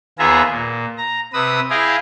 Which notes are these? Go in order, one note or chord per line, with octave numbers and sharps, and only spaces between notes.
D#2 B3 F4 G#4 E5 A#5
A#2
A#5
C3 B4 D#6 E6
E4 G#4 D#5 F5 G5